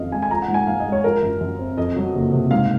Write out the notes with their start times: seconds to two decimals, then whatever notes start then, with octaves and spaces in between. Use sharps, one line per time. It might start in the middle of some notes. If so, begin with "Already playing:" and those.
Already playing: F2 D#3 C#4 D#5 F5
0.12 G#3 G#5
0.22 G#5
0.30 F3 A#5
0.42 F#5
0.48 G#2
0.54 G#5
0.67 G#2 F5
0.80 D#5
0.86 G#3
0.92 C#5
1.04 F3 A#4
1.22 F#2
1.41 F#2
1.59 C4
1.77 F2 D#5
1.96 F#3
2.15 F#1
2.33 C3
2.51 G#2 F5